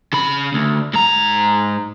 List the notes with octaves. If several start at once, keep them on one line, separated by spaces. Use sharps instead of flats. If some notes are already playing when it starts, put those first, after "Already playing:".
C#3 B5
D2
G#2 A#5